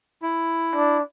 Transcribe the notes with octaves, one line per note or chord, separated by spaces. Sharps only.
E4
D4